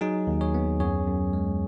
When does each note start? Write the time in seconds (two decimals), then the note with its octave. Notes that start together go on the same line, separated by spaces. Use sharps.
0.01 F#3 D#4 G#4
0.27 D#2
0.41 G#4 C#5
0.54 B3
0.80 F#2 G#4 C#5
1.07 F#2
1.33 G#3